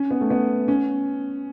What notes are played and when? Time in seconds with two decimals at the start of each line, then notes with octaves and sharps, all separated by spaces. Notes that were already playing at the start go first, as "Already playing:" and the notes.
Already playing: C#4
0.11 B3
0.21 A3
0.30 B3
0.68 C#4